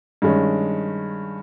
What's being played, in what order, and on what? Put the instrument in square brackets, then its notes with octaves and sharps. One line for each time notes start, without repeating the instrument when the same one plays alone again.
[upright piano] G2 D#3 G#3 C#4